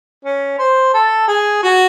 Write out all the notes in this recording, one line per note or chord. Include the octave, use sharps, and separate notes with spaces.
C#4
C5
A4
G#4
F#4